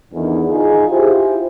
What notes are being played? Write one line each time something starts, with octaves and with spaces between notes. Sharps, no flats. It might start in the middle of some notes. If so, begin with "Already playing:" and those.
E2 D3 D#3
D#4 F4 G#4
E4 F4 G4 G#4 C5